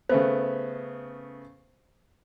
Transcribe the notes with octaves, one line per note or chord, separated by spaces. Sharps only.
C#3 A3 B3 C5